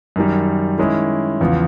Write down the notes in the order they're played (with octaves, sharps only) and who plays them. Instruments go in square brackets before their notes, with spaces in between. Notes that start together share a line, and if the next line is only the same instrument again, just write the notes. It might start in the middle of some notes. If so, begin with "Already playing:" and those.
[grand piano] F#2 D#3 G3
D#3 G#3 C#4 E4
E2 C#3 F3